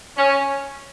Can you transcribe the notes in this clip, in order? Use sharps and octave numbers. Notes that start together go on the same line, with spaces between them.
C#4